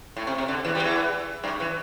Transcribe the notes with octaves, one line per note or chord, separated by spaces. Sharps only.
A2
C3
C3
D3
E2 E3
G3
E2 E3
G2 G3
E3